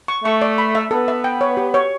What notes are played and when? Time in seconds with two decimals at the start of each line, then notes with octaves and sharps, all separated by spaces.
0.08 C#6
0.24 A3 C#6
0.42 D5
0.58 B5
0.75 E5
0.91 B3 A4
1.08 E5
1.24 G5
1.41 C#5
1.57 G4
1.74 C#5